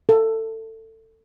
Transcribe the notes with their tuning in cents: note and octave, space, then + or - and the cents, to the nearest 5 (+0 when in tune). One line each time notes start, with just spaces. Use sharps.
A4 +20